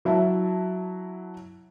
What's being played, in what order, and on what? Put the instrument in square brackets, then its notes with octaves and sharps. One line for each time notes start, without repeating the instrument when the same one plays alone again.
[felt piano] F#3 E4 E5 A5